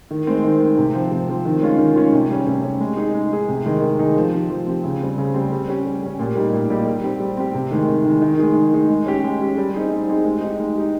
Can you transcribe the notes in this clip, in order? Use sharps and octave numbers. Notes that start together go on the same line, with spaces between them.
D#3
G#3 C4
D#3
G#3 C4
C3
F3 C4
C3
F3 C4
D#3
G#3 C#4 F4
D#3
G#3 C#4 F4
C3
G3 C#4
C3
G3 C#4
G#3
D#4 G#4
G#3
D#4 G#4
C3
D#3 G#3 D#4 G#4
C3
D#3 G#3 D#4 G#4
F3
C4 G4
F3
C4 G4
C#3
G3 C4
C#3
G3 C4
G3
C#4 G4
G3
C#4 G4
A#2
G3 A#3 D#4 G4
A#2
G3 A#3 D#4 G4
G3
C4 G4
G3
C4 G4
C3
D#3 G#3
C3
D#3 G#3
D#3
G#3 D#4 G#4
D#3
G#3 D#4 G#4
G#3
C#4 G4
G#3
C#4 G4
G3
C4 D#4 G#4
G3
C4 D#4 G#4
G#3
D#4 G4
G#3
D#4 G4